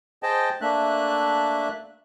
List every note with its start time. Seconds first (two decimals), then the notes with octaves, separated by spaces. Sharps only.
0.23 G#4 C5 D#5 G5 A5
0.61 A3 A#3 D4 E5 F#6